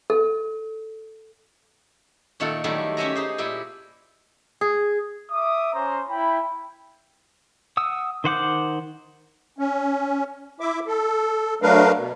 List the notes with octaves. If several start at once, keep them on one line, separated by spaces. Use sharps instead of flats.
A4
A#2 D#3 A3 F4 A4 F#5
D#3 F#3 G3 A3 E4 F4
C#4 G4 C#5 E5 G#5 A#5
D#4 G#4 C5
A#2 G3 E4 G5 G#5
G#4
E5 D6 D#6
C#4 C5 A#5 C6
E4 G5 B5
F#5 D#6 E6
D#3 C5 F#5 D6 G6
C#4
E4 E5 D6
A4
F#3 A3 D4 A#4 B4 F5
B2